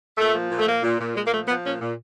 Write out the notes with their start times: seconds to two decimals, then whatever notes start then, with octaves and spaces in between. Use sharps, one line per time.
0.17 A#2 A3
0.34 F3
0.50 A#2
0.58 A3
0.66 A#2 A#3
0.82 A#2
0.99 A#2
1.15 A#2 G#3
1.26 A#3
1.32 F3 A3
1.48 F3 B3
1.65 A#2 C#4
1.80 A#2